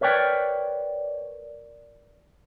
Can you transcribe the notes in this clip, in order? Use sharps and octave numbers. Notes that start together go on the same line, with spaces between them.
A#4 B4 C#5 D5 G5